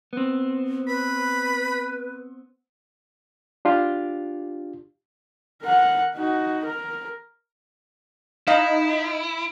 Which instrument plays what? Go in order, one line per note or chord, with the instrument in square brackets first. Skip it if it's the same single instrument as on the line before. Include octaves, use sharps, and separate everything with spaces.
[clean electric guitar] B3 C4
[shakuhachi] B4 [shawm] B5
[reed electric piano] D4 F4 G4
[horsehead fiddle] A#4 F#5
D#4 F#4
A#4
[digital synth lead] D#4 [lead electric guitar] E4 [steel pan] F5